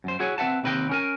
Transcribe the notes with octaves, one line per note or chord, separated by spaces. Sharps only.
F#2 C5
E4 F#4 G#4 C#5
C4 B4 E5 F#5 A5
D#2 C3 B4 D#5 G5
C#4 A#4 G#5